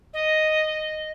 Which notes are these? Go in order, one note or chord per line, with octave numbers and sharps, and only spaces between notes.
D#5